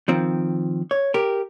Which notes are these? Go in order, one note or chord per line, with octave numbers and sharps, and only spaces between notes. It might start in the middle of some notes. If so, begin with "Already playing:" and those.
D#3 F3 C4
C#5
G4 A#4